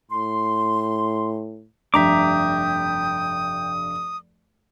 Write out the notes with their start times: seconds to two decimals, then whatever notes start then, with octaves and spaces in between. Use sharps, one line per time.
0.11 A2 C6
1.94 F1 G2 E5 G5 A#5 D6 D#6